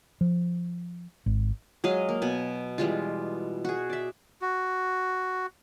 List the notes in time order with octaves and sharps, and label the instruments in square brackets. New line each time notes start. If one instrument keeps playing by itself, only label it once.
[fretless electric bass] F3
G#1
[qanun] F#3 G#3 D#5 F5
A#3
B2 G#5 B5
E3 G3 G#3 F4
F#4 G#4
D5 E5
[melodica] F#4